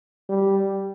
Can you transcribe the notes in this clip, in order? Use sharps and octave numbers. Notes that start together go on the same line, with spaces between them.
G3